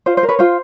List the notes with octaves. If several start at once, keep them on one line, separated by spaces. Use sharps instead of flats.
F4 C5
C5
A#4
B4 C#5
F4 C5